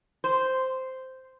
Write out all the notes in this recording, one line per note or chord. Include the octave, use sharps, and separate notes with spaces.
C5